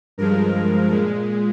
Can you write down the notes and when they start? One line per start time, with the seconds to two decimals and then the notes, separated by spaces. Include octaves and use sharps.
0.18 G2 F3 G#3 A#4
0.91 A#2 G#3